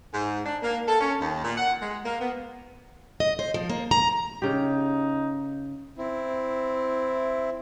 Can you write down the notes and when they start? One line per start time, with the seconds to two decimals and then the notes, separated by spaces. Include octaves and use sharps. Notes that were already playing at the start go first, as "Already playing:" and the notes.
0.14 G#2
0.46 D4
0.62 A#3
0.88 A4
1.01 C#4
1.21 D#2
1.44 A#2
1.58 F#5
1.82 G#3
2.05 A#3
2.21 B3
3.20 D#5
3.39 C5
3.54 F3
3.70 A#3
3.91 A#5
4.42 C#3 D#4 G4
5.98 C4 E4